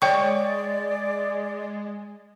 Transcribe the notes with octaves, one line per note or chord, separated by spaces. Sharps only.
G#3 C#5 D5 G5 C#6